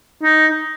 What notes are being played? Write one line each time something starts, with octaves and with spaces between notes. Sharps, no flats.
D#4